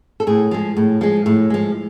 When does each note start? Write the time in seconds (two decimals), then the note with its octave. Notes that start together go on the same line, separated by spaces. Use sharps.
0.20 A4
0.27 A2 G#4
0.51 F3 G#3
0.77 A2
1.01 F3 G#3
1.26 A2
1.50 F3 G#3